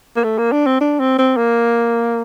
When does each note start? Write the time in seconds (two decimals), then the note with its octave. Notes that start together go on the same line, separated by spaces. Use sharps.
0.16 A#3
0.24 A3
0.38 A#3
0.52 D4
0.66 C4
0.81 D4
1.00 C4
1.18 C4
1.37 A#3